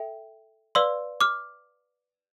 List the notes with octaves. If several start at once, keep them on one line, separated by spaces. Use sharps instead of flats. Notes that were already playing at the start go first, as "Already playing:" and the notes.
Already playing: A4 E5 G5
B4 D5 F5 C6 E6
D6 F6